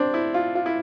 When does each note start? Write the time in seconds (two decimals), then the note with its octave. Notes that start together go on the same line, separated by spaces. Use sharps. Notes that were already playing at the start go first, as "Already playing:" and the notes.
Already playing: C4 D4
0.14 E4
0.34 F4
0.55 F4
0.66 E4